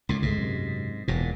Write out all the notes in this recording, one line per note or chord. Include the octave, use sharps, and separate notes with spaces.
C#2 A2
G1 C#2 G#2 A3
F#2 C3
E1 E2 A#2